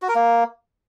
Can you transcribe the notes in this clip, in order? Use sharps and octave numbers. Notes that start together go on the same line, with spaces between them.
F#4
A#4
A#3